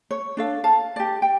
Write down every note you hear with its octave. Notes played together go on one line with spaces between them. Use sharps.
C#5
D4 A4 F5
F5 A5
G4 D5
G5